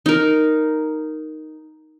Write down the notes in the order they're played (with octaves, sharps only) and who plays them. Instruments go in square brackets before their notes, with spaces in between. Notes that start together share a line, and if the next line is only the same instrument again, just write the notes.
[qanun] D#4 A#4